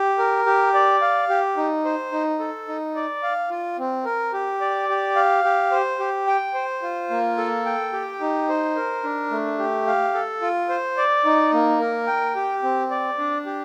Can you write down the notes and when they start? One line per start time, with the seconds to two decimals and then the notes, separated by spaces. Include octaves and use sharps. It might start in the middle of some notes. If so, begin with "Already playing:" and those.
Already playing: G4
0.18 A#4
0.46 G4
0.74 D5
1.01 F5
1.30 G4
1.57 D#4
1.85 C5
2.12 D#4
2.39 A4
2.68 D#4
2.95 D5
3.23 F5
3.50 F4
3.79 C4
4.05 A#4
4.33 G4
4.61 D5
4.89 G4
5.16 F5
5.44 G4
5.71 C5
6.00 G4
6.27 G5
6.54 C5
6.82 F4
7.10 A#3
7.38 A4
7.66 G5
7.93 G4
8.21 D#4
8.49 C5
8.76 A#4
9.04 D4
9.31 A3
9.59 G4
9.87 F5
10.14 A4
10.41 F4
10.69 C5
10.97 D5
11.25 D#4
11.53 A#3
11.80 A#4
12.07 G5
12.36 G4
12.63 C4
12.91 D5
13.18 D4
13.46 G4